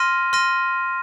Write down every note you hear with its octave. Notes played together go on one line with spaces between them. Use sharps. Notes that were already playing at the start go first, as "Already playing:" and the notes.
Already playing: C6 F6 A#6 D#7
C6 F6 A#6 D#7